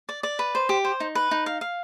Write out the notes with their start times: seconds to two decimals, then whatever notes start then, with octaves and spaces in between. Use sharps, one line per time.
0.09 D5
0.23 D5
0.39 B4
0.55 C5
0.69 G4
0.84 C5
1.00 D#4
1.15 B4
1.31 D#4
1.46 F5
1.61 F5